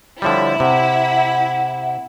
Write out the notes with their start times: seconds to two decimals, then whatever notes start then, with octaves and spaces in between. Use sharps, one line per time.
0.22 D3 F3 G3 E4 C#5
0.60 C3 F#5